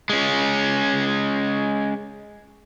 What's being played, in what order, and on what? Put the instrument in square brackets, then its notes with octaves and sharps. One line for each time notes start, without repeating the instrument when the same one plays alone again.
[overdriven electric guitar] G#3 C#4